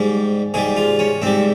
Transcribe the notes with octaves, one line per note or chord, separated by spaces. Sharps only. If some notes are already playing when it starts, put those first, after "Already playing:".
Already playing: G#2 G3
G#2 G3 G#4
F4
C#4
G#2 G3 C4